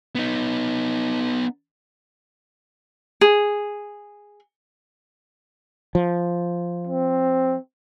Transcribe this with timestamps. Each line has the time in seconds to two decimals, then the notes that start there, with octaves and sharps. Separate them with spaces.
0.15 B3 D#4
3.21 G#4
5.95 F3
6.87 C4